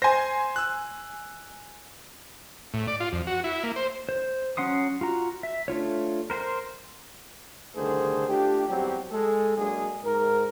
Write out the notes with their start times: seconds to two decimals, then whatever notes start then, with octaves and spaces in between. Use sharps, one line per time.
0.02 C5 G#5 C6 A#6
0.56 E6 F#6
2.74 A2
2.88 D5
3.00 F4
3.13 F2
3.27 F#4
3.44 E4
3.63 A#3
3.76 C5
4.09 C5
4.57 F#3 C#4 F#5 C6 D#6
5.01 F4 F#4 A#5
5.43 E5
5.68 A3 D4 F4 C#5
6.30 A#4 C5 F#5 C6
7.75 C2 D3 D#3 A3 G#4 C5
8.28 A3 D4 F4 G4
8.68 E2 F#3 G3 C4 G4
9.11 G#3 A4
9.57 F#3 G#3 A#3 D4 G#4
10.04 G#2 A#4